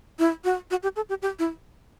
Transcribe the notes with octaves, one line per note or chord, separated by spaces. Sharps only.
E4
F#4
F#4
G4
A4
G4
G4
E4